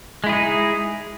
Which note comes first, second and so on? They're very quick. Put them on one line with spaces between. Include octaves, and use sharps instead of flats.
G#3 E4 G#4 D#4